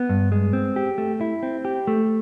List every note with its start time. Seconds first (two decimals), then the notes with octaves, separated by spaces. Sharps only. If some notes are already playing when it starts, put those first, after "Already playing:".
Already playing: B3
0.09 G2
0.32 G#3
0.53 C4
0.76 G4
0.98 A3
1.21 E4
1.43 C4
1.65 G4
1.87 A3